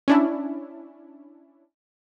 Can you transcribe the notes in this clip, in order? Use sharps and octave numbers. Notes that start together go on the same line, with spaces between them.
C#4 D4 E4